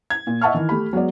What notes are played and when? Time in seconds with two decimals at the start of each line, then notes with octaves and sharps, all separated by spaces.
0.10 G#6
0.27 A#2
0.41 D#5 E5 F#5 A5 C#6 F6
0.54 D#3 E3
0.69 A3 G4 B5
0.93 F#3 G#3 B3 D5